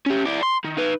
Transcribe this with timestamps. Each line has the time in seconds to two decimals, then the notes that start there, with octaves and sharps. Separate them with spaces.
0.06 C#4 G4
0.26 E4 D5
0.43 C6
0.64 D#3
0.77 D#4 B4